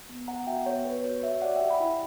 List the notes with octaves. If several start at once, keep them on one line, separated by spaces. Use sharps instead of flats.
B3
B3 F#5 A#5
F#4 E5 G5
B3 C#5
C#5
B3 B4
F#4 C#5
F#4 C#5 E5
G4 D5 F#5
E5 G5
G4
G5 B5
E4